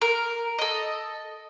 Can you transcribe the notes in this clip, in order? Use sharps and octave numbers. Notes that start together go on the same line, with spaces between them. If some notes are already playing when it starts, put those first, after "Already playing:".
A#4
A4 D#5